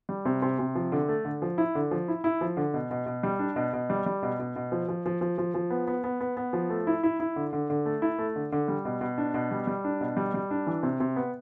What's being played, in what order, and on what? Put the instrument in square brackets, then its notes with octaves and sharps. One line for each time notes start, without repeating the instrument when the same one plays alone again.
[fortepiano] G3
C3
C3
C3
F3
D3
A3
D3
F3
E4
D3
F3
E4
E4
F3
D3
B2
B2
B2
G3
D4
B2
B2
G3
G3
B2
B2
B2
F3
F3
F3
F3
F3
F3
B3
B3
B3
B3
B3
F3
A3
E4
E4
E4
D3
D3
D3
A3
E4
A3
D3
D3
G3
B2
B2
D4
B2
G3
G3
D4
B2
G3
G3
D4
E3
C3
C3
B3